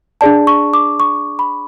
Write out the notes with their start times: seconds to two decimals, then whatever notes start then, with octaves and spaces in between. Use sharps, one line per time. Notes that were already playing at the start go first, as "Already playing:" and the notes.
0.21 D4 G#4 D5 A5
0.47 C#6
0.74 D6
1.00 C#6
1.39 B5